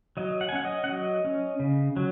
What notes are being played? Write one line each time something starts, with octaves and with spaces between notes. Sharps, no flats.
F#3 D#5
F#5
G#5
C#4 F#5
D#5
F#5
F#3 D#5
C#4
C#3
F#3